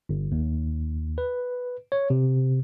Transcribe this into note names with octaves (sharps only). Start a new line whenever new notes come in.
G1
D#2
B4
C#5
C3